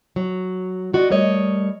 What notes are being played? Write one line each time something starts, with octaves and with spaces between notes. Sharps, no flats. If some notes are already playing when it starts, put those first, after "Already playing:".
F#3
F4 F#4 D5 D#5
G3 A3 A#4 C#5 D#5